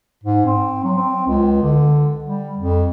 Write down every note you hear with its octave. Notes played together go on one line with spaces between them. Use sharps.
G#2
C4
F#3
C4
C#2
D3
G3
F2